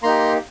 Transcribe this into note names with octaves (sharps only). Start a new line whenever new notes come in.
A#3 D#4 G4 A#5 C6